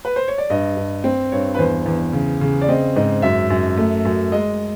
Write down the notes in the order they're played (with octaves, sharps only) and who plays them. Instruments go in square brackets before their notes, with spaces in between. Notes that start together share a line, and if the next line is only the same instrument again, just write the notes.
[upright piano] B4
C5
C#5
D5
G2 D#5
G2
C4
G2 C#5
B4
E2 C5
E2
C#3
C#3
D5
C4 D#5
G#2 D#5
F#2 E5
F#2
A3
F#2
G#3 D#5